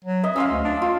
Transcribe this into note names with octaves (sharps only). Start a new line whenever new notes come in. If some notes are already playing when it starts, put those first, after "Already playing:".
F#3
D#5 E5
C#4 F5 C6 E6
D2
D4
F4